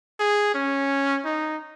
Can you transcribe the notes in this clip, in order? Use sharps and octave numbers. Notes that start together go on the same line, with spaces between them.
G#4
C#4
D#4